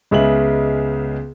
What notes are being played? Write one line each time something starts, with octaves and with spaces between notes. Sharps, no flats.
C#2 C#3 G#3 B3 E5 F#7